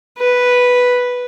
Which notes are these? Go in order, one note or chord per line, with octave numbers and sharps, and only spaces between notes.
B4